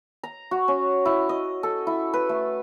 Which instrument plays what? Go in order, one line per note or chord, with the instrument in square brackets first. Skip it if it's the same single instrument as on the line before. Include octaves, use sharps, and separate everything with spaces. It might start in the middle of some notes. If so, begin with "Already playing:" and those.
[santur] A#5
F#4
C#4
E4
D#5
A4
E4
B4
A3